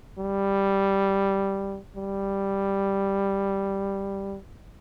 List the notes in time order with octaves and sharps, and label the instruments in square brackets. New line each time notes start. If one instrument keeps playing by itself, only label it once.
[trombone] G3
G3